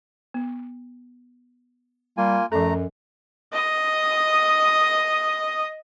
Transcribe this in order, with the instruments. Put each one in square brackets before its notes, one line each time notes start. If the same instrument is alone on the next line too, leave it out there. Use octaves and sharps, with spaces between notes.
[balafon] B3
[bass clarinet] G3 [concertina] A#3 F4 G#5
[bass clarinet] F#2 [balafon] F3 A4 [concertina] A3 A#5
[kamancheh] D#5 D#6